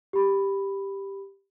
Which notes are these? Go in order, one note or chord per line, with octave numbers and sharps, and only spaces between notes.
G4 B5